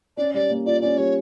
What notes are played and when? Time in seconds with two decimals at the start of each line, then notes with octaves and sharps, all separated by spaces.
0.17 C#4 D5
0.34 G3 D5
0.50 A#3
0.66 F4 D5
0.81 C#4 D5
0.97 G3 C#5